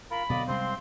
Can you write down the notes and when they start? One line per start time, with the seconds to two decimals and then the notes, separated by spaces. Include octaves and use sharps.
0.11 F4 A#4 B5
0.30 B2 D3 F#3 D5 D#5 F5
0.48 C3 G3 G#3 C4 C5 C6